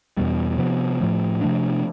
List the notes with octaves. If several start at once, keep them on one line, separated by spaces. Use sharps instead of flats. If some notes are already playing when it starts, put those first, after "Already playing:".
E2 B2 G3
C3 F3 B3
A2 F3 A3
C3 F3 A3 D4